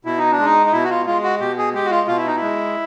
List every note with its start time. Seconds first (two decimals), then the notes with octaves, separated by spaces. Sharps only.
0.05 B2 E4
0.18 D#4
0.32 D4
0.39 G#3
0.45 D#4
0.66 D#4
0.72 B2 E4
0.83 F#4
0.90 F4
1.06 G#3 F4
1.23 F#4
1.40 B2 G4
1.58 G#4
1.74 G#3 G4
1.86 F#4
1.91 F4
2.08 B2 F4
2.17 E4
2.27 D#4
2.36 E4
2.42 G#3